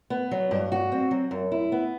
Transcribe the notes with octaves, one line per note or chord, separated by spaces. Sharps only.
B3
F#3
G2
F#4
C4
F#3
F#2
E4
B3